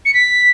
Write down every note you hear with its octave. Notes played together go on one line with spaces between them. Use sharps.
C#7
B6